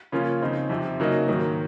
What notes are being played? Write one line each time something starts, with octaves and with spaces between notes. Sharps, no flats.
C#3 F3 A#3 C#4 F4
C#3 F3 C4 D#4
F2 C3 F3
C#3 F#3 A#3 D#4
G#2 D#3 F#3 A#3